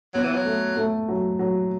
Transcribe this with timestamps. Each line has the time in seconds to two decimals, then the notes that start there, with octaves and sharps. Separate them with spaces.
0.14 F#3 B3
0.24 E3
0.33 F#3
0.45 A3
0.77 A3
1.08 F#3
1.39 F#3